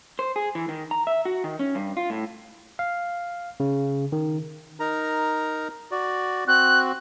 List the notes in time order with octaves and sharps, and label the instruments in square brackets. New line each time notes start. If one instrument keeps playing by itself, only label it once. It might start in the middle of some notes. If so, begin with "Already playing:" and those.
[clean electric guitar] C5
G#4
E3
D#3
A#5
E5
F#4
D#3
C#4
G2
F4
A2
[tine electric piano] F5
C#3
D#3
[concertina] D#4 A#4 A#5
F#4 D5
[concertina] C4 F#4 [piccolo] F#6